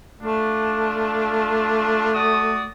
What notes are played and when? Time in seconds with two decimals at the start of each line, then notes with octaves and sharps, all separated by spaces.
0.22 A3 D4 F4
2.14 F#4 D5 D#6